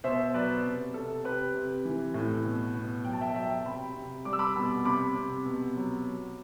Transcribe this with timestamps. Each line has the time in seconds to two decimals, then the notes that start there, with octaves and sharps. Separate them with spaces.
0.04 B2 C5 E5
0.34 F#3 B4 D5
0.65 C3
0.94 C3 A4
1.24 C3 G4 B4
1.54 C3
1.85 E3
2.14 A2
2.45 B2
2.74 B2
3.04 F#3 G5
3.13 A5
3.21 E5 G5
3.35 F#3 E5 G5
3.65 C3 G5 B5
3.95 C3
4.25 G3 D6
4.33 E6
4.39 B5 D6
4.56 B2
4.85 C3 B5 D6
5.15 C3
5.45 B2
5.76 F#3
6.05 F#3